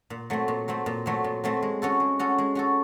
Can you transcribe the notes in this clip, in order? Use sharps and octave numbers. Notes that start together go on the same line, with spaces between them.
A#2
F#3 A3 C4
A#2
F#3 A3 C4
A#2
F#3 A3 C4
A#2
F#3 A3 C4
G#3
C#4 F#4 A4
G#3
C#4 F#4 A4
G#3
C#4 F#4 A4